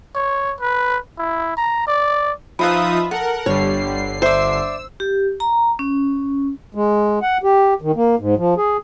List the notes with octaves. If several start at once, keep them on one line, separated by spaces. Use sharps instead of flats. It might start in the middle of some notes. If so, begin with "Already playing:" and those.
C#5
B4
E4
A#5
D5
F3 D#4 F4 B4 E5 F5 B5 D#6
A4 A#4 F#5
G1 D3 G3 C#5 C7
C5 D5 E5 E6
G4
A#5
C#4
G#3
F#5
G4
D#3
A#3
G#2
F3
G#4